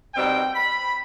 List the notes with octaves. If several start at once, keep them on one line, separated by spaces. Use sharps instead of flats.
B2 G3 C4 D#4 G5
B5